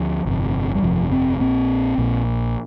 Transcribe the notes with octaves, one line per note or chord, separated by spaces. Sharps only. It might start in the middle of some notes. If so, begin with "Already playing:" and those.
Already playing: D2 F3
G1 F2 C3
G3
G1 F2 C3 F3
C4
A#1 A#2 C4
A#1 A#2